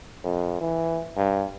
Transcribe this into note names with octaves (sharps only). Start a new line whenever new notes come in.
F2
E3
G2